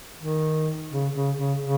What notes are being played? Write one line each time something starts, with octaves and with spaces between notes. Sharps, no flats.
D#3
C#3
C#3
C#3
C#3